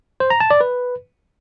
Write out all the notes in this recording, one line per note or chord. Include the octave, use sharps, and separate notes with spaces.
C5
A#5
A5
D5
B4